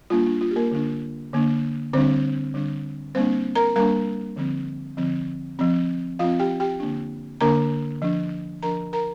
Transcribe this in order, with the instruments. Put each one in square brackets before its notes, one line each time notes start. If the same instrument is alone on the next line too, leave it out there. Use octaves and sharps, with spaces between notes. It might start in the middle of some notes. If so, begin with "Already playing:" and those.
[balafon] G3 A#3 D4 F4
D4
F4
G4
A#3 A#4
D3 A#3 D4
D3 A#3 D4
D3 G3 C4 D4 C5
D3 G3 D4
G3 A#3 C4 D4 C5
A#4 A#5
G3 A#3 D4 A#4 A#5
D3 F3 C4
D3 F3 C4
F3 C4
F3 F4 F5
C4
G4 G5
G4 G5
D3 A#3 D4
D3 A#3 D4 A#4 A#5
F3 D4
F3 D4 A#4 A#5
A#4 A#5